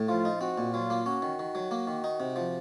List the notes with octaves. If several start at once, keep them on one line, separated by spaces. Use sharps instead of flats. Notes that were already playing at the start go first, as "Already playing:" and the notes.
Already playing: A2
F3 F4
D#4
C4 F#4
A#2
F#3 F4
A#3
C#4 F#4
D#3
D#3
F#3
A#3
D#3
D#4
C3
F3